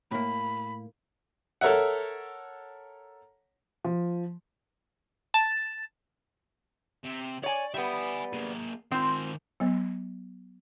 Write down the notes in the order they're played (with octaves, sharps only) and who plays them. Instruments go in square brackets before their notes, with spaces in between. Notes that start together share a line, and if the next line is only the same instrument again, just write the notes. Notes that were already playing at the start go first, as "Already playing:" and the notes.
[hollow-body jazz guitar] A2 A#3 [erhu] B5
[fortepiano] A4 A#4 C#5 E5 F#5
[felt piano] F3
[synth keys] A5
[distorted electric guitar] C3
[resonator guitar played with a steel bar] C#5 G#5 [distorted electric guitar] D5
[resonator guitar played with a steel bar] G3 B3 [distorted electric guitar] E5 G#5
[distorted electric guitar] A#3 G#4
[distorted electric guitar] D#3 C5 [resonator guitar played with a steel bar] C4 F4
[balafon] F#3 B3